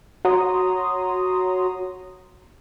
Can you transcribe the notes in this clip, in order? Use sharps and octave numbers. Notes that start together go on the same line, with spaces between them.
F#4 C#5 A#5 C6 D#6